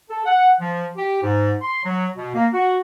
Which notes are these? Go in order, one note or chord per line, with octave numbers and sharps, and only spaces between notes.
A4
F#5
F3
G4
G#2
C6
F#3
B2
A#3
F#4